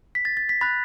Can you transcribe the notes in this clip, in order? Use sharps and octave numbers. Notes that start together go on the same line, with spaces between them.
B6
A6
A6
B6
B5 F#6 A6